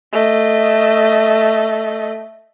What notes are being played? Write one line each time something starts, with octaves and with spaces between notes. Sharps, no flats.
A3 D#5